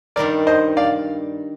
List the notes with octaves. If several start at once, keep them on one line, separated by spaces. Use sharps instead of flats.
G2 D#3 G3 A#4 D5
C5 D#5
D5 F5